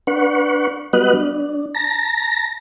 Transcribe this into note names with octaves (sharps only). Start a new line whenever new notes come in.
D4 B4 F#5 C#6
G3 B3 F#4 B4 D#5 F#6
D4
A5 A#5 A#6